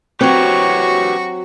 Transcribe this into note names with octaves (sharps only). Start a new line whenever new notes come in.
F#3 C4 F#4 G4 B4 C#5 C#6